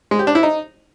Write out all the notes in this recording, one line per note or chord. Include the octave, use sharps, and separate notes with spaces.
G#3
G4
D4
E4
D#4